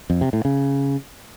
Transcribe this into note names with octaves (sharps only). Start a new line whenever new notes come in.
F2
C3
A2
C#3